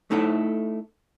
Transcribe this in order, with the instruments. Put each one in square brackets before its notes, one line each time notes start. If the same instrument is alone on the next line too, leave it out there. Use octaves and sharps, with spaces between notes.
[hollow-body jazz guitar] A3 D#4 E4 A4